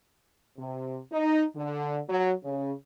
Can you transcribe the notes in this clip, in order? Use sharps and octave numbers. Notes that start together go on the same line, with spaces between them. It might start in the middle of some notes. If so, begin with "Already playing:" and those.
C3
D#4
D3
F#3
C#3